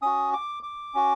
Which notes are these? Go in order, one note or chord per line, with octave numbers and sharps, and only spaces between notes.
C#4 F#4 D#6
D6
D6
C#4 F#4